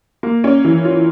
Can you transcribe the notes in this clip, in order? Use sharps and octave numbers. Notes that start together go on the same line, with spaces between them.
A#3
C#4
E3
F4